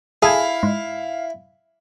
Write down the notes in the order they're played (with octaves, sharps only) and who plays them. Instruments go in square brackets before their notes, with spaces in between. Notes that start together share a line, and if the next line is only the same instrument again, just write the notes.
[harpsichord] E4 [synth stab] G#4 A4 G#5 [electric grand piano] F5
[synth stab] G#2